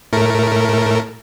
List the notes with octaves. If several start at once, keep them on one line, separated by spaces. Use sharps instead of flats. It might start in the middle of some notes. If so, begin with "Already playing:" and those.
A2 A3 A#4